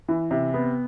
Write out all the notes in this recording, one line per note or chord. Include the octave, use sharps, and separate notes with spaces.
E3
C3
B3